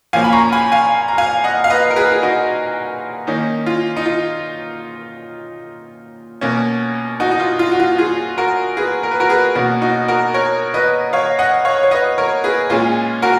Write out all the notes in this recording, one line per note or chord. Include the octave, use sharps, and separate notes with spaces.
A#2 F3 A#3 C#4 F5 G#5
B5
A#5 C#6
G#5 B5
F5 G#5
A#5
F5 G#5
D#5 F#5
F5
B4 D#5
A#4
G#4 B4
G#4
D#4 F#4
D#3 A#3 C#4 D#4
F4
D#4
F4
B2 A#3 C#4
D#4 F#4
D#4
F4
F4
F#4
F4
F4 G#4
F#4 A#4
G#4 B4
A#4
B4
F#4 A#4
G#4 B4
B2 A#3 C#4 F#4 A#4
D#4 F#4
F#4 A#4
A#4 C#5
B4 D#5
C#5 F5
D#5 F#5
C#5 F5
C#5
B4 D#5
A#4 C#5
G#4 B4
A#2 G#3 C#4 F4 G#4
F#4 A#4